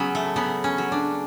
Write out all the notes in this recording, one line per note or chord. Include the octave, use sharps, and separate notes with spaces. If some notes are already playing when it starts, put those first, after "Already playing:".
Already playing: C#3 F#3 B3 C#4
A3
C#3 B3
C#4
F#3
D4